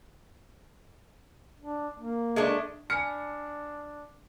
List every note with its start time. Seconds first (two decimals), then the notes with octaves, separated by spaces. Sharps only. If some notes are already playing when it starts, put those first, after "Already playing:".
1.61 D4
1.99 A#3
2.36 G#3 A3 D4
2.90 D4 G#5 A5 B5 F6 C#7